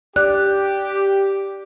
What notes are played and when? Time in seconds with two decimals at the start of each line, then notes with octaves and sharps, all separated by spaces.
0.16 G4 D5 F#6